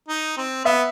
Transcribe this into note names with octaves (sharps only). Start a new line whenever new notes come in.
D#4
C4
B3 E5